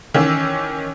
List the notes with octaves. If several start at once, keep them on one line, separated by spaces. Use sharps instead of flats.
D#3 E3 C#4 E6